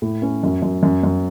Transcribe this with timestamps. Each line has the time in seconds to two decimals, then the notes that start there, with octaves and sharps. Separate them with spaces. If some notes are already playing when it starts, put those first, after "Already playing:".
0.02 A2
0.22 C#4
0.43 F#2
0.62 F#2
0.83 F#2
1.04 F#2